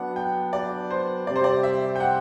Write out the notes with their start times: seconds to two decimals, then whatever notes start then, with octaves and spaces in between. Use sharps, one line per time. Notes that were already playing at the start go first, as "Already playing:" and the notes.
Already playing: F#3 B3 D4 F#5
0.16 G5
0.53 D5
0.90 C5
1.27 C3 G3 C4 G4 D5
1.36 C5
1.44 D5
1.63 E5
1.96 G5
2.00 F#5